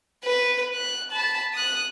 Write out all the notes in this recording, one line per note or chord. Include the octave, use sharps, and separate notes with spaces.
B4
F#6
A5 B5
D#6 F#6